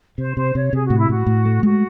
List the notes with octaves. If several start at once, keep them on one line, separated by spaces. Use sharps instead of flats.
C3 C5
C3 C5
C3 C#5
C3 G#4
A2 F#4
E4
A2 F#4
A2
A3
G#3 F#4